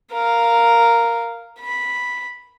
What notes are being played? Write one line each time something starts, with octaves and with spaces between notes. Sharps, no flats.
A#4 F5
B5